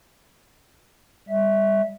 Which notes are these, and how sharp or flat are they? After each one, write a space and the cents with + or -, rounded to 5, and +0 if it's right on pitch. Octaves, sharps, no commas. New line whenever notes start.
G3 +25 E5 -15